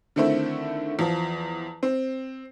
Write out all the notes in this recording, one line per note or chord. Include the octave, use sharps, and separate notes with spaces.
D3 D#3 A3 C4 E4
E2 F3
C4